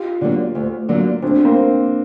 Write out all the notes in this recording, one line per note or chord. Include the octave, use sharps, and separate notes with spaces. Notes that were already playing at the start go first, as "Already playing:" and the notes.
Already playing: F4 G4
D3 F#3 A#3
D2
D3 F#3 A#3
D2 C4 D4
A#3 C4